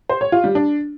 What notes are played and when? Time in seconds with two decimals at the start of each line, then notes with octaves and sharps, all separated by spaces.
0.09 C5
0.21 C#5
0.32 F4
0.44 G3
0.55 D4